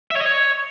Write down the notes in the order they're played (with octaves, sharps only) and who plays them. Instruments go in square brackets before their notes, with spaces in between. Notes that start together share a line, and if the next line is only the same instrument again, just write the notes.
[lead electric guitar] E5
C#5
D#5
C#5